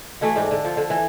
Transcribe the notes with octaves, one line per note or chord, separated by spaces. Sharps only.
E3 A3 E4 F#4
G#2 D4 G5
D3
F3
D3
E3